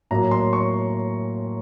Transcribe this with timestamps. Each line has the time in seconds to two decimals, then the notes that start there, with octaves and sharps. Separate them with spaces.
0.11 A2 F#3 A#3 A#5
0.31 C6
0.53 C#6